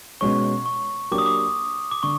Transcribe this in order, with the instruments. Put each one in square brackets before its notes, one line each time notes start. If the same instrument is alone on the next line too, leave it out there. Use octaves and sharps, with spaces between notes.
[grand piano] B2 G#3 C#4 [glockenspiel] C#6
[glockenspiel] C#6
[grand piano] F#3 A#3 D4 G4 [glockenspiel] D6
[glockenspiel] D#6
D6
D6
[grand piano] D3 [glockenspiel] C#6